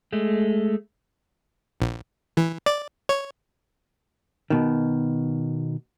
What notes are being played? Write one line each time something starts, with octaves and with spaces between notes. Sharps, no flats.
G#3 A3
A#1
E3
D5
C#5
B2 D#3